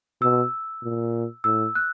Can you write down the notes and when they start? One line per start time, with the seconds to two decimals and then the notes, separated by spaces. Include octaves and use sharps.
0.21 B2 E6
0.83 A#2
1.44 A2 E6
1.75 F#6